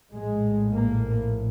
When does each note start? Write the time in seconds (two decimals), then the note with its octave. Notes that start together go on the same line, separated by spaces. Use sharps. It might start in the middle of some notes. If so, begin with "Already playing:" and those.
0.13 A#1 A2 G#3
0.74 A#3